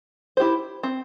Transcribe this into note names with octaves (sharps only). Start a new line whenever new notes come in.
E4 G4 C5
C4